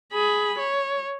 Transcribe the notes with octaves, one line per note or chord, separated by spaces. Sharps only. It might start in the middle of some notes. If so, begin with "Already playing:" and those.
G#4 B5
C#5